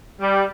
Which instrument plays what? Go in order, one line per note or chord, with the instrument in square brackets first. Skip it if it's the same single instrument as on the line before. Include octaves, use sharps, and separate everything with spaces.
[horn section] G3